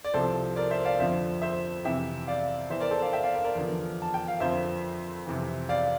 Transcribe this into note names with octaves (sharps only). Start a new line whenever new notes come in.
D5
C2 C3 F3 A4 C5
A#4 D5
C5 E5
D5 F5
F2 D3 F3 C5 E5
C5 E5
F2 C3 E3 E5 G5
D5 F5
E2 E3 C5 E5
A#4 D5
A4 C5
D5 F5
E5 G5
D5 F5
A#4 D5
A#4 D5
E2 D3 F3
A5
G5
F5
F2 D3 F3 C5 E5
F2 C3 E3
D5 F5